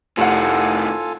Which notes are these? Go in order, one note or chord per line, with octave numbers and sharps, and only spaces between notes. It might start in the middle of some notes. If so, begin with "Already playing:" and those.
F1 A2 D#3 F4 A4 F#5 G#5